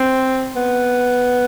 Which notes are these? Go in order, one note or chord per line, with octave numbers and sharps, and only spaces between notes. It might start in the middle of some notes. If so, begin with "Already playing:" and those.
Already playing: C4
B3